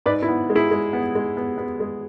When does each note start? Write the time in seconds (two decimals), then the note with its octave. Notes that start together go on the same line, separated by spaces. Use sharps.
0.06 G#2 B4 D5
0.23 E4
0.28 B3
0.50 G#3
0.55 E4 G#4
0.71 G#3
0.93 B3
1.15 G#3
1.37 B3
1.58 B3
1.80 G#3